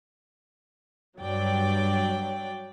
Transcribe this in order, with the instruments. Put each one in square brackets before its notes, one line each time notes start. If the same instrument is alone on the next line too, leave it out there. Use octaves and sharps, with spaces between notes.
[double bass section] G2 [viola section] F#3 D5 G5